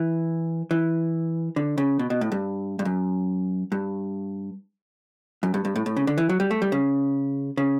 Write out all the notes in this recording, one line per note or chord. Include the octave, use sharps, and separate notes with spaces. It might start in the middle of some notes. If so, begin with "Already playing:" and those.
Already playing: E3
E3
D3
C#3
B2
B2
A2
G2
G2
F#2
G2
F#2
G2
G2
A2
A2
C#3
D3
E3
F#3
G3
A3
G3
C#3
C#3